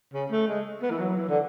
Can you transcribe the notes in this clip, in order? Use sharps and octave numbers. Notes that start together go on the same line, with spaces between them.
C#3
A3
G#3
B3
E3
F#3
E3
D3